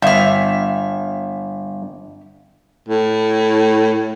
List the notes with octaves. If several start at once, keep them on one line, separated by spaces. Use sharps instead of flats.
G1 E5 F6
A2